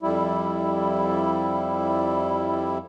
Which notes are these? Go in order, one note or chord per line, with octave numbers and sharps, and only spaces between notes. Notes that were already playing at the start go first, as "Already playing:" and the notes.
F2 G3 E4